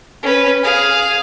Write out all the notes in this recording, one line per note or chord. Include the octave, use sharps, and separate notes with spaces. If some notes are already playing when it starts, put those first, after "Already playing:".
C#4 B4
G#4 F5